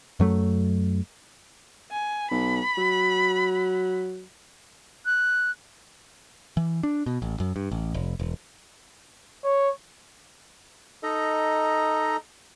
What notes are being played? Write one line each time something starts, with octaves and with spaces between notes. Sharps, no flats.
F#2 F#3 A3
G#5
B1 B5
F#3
F#6
E3
D4
B2
A1
F#2
G2
A1
F1
E1
C#5
D#4 A4 D#5 A#5